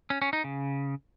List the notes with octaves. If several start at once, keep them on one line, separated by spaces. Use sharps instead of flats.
C#4
C#4
D#4
C#3